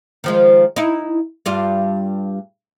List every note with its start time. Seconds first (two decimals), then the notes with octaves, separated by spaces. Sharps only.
0.24 D#3 F3 G#3
0.76 D#4 E4
1.46 G2 G3 F4